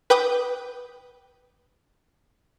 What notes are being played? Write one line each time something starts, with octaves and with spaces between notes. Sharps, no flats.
B4 G5 D6 D#6